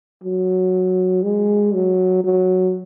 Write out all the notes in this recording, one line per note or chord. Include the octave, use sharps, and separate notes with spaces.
F#3
G#3
F#3
F#3